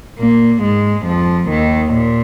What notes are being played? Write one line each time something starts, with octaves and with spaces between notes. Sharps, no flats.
A#2 A#3
G#2 G#3
F2 F3
D#2 D#3
A#2